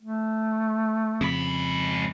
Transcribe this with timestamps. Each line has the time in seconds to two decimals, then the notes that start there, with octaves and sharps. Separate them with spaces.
0.01 A3
1.21 F2 G#2 C#3 B5